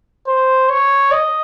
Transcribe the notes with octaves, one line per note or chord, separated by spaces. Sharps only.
C5
C#5
D#5